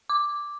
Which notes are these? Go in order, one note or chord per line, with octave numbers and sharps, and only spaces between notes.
D6